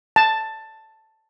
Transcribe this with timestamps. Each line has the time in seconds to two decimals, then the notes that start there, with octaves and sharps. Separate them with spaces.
0.16 A5